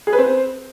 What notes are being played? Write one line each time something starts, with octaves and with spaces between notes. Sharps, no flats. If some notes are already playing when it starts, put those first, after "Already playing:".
G#4
B4
C4